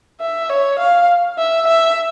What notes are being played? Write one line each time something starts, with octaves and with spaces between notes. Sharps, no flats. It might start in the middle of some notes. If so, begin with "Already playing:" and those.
E5
C#5
F5
E5
E5